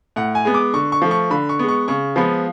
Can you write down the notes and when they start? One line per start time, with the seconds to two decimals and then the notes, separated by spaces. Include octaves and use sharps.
0.16 A2 F#5
0.35 G#5
0.45 G#3 B3
0.54 D6
0.74 D3 C#6
0.92 C#6
1.02 F3 A3
1.11 C#6
1.30 D3 B5
1.49 C#6
1.59 G#3 B3
1.68 C#6
1.88 C#3 C#6
2.16 F3 G#3 B3 B5